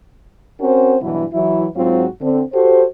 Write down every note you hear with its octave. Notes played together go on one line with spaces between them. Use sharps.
C4 C#4 F#4 A#4 C5
G2 B2 E3 F#3 E4
E3 F#3 E4
G#2 F#3 C4 F4 F#4
D3 C4
F#4 G4 A4 C5